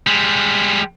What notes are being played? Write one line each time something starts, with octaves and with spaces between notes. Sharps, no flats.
G3 G#3